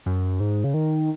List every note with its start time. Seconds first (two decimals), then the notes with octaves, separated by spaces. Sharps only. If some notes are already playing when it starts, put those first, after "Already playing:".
0.06 F#2
0.40 G#2
0.64 C#3
0.74 D#3